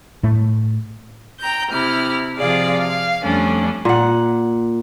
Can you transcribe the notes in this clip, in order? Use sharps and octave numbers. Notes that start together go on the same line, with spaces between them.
A2 A3
G5 A#5 G6
C3 E4 F6
C3 F3 F4 G#4 D5 F5
F5
F2 G3 A3 C#4 D4
A#2 F#5